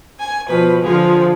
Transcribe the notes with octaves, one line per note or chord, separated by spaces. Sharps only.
G#5
B2 F3 B4
D3 F3 F4 G#4